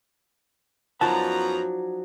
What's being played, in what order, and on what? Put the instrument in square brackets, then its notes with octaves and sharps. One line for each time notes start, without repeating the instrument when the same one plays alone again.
[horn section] F#2 B3 A#5 [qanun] F3 D#4 D5 [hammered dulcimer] F#3 [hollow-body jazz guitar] A5